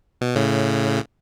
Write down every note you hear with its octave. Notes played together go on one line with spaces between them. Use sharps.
B2
A2 C#3